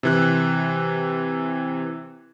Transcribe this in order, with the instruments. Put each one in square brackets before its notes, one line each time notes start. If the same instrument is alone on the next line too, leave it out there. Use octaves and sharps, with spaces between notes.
[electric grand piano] C3 E3 F#6